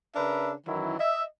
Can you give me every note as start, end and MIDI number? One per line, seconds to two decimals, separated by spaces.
0.16 0.52 49
0.16 0.52 62
0.16 0.52 70
0.16 0.52 71
0.16 0.52 76
0.67 0.97 42
0.67 0.97 51
0.67 0.97 52
0.67 0.97 54
0.67 0.97 64
0.99 1.24 75
0.99 1.24 76